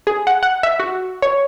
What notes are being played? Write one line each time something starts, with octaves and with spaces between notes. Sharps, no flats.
G#4
F#5
F#5
E5
F#4
C#5